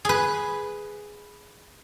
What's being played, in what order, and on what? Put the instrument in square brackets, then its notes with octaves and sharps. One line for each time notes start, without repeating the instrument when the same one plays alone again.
[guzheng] G#4 B4